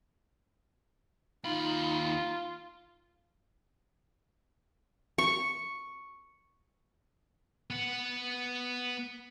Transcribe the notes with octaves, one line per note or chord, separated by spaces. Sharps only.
D#2 D#4 F4 B5
C#6
B3 F#5